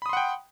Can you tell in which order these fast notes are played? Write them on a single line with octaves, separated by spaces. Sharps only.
B5 D#6 C6 F#5 G5